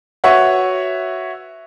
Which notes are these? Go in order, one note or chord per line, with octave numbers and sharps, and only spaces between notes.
F#4 B4 C#5 E5 F#5